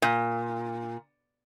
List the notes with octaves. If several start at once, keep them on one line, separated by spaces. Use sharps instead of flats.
A#2